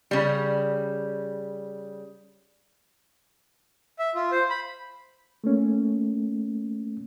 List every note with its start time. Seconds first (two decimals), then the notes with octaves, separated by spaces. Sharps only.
0.11 C#3 G3
3.99 E5
4.15 F4
4.32 C5
4.50 B5
5.44 A3 A#3 C#4